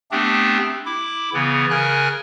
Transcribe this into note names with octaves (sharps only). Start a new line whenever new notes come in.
A3 B3 C4 D4 G4
E4 D6
C#3 E3 B3
C#3 A#4 G#5 F#6